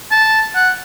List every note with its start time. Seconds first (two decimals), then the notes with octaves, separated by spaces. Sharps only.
0.11 A5
0.55 F#5